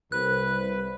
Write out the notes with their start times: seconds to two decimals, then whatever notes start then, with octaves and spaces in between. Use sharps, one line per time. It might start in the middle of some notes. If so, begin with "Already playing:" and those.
0.12 C2 B4 F#6